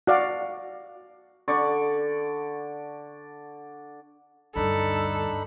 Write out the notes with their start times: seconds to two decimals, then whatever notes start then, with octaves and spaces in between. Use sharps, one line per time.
0.07 F#4 D5 F5
1.48 D3 D5 C#6
4.56 D2 G2 D4 D#4 A4 B5